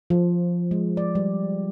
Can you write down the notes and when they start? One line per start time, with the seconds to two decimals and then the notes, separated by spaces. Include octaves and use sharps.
0.10 F3
0.71 G#3
0.97 D5
1.15 G3